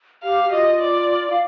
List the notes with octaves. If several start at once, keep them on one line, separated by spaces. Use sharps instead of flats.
G4 F5
G4
F4 D#5
D5
F5